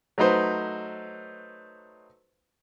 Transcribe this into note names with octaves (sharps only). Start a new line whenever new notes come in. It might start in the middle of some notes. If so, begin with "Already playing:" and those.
F#3 A3 D#4 B4 C5